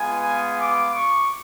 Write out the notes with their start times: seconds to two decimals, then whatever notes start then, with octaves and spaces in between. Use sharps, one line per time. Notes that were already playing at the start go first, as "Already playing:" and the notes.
Already playing: G#3 B3 F4 G#5
0.59 D6
0.93 C#6